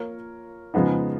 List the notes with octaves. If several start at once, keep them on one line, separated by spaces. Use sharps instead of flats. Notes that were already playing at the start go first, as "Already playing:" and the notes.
Already playing: A#3 F4 A#4 C#5
C#3 F3 G#3 B3 D#4